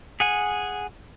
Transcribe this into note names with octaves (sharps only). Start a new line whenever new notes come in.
G#4 F#5 G#5